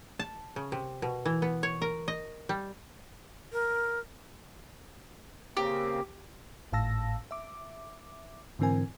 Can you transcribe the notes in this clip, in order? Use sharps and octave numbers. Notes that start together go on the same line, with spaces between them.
A5
C#3
C3
B2
E3
B3
C#5
A#4
D#5
G3
A#4
C#3 A#3 C4 G4
G#1 A2 F5 A5 E6 A#6
E5 D6
G#2 D3 E3 C4 A#4 G#5